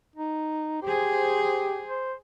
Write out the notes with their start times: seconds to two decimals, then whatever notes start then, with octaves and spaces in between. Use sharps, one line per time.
0.16 D#4
0.82 G4 G#4 C5
1.88 C5